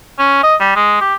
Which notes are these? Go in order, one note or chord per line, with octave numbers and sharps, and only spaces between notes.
C#4
D#5
G3
G#3
G4